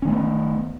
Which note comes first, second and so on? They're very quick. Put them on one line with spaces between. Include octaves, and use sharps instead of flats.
C#4 D#3 A3 B3